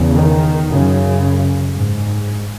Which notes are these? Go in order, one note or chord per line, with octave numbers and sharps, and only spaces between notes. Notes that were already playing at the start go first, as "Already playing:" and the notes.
Already playing: E2 C#3
D#3
F#2 C#3
G#2